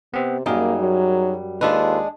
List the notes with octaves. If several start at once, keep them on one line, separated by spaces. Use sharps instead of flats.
C3 B3 C4
F#2 G3 A#3 D#4 G#4 A#4
F#3
D#2 G#3 D4 F4 G#4 A4 B4